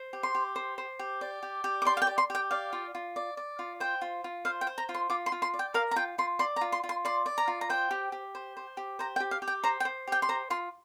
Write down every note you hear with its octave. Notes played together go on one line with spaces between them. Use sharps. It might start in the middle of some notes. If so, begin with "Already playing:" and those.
Already playing: C5
G4
C6
G4
C5
C5
G4
D5
G4
G4
D6
D5 C6
F5
G5
D5
C6
G4 G5
D5 F5
F4
F4
D5
D5
F4
C5 G5
F4
F4
C5 F5
G5
C5
A#5
F4
C6
F4 D6
C6
F4
C6
D5
G5
A#4 F5
A#5
F4 G5
F4 C6
D5 C6
A#5
F4
C6
F4
C6
D5 C6
D5
A#5
F4
A#5
C5 G5
G4
G4
C5
C5
G4
C5 A#5
G5
G4
F5
G4
G5
C5 A#5
G5
C5
G4 G5
C6
C5 A#5
F4 C6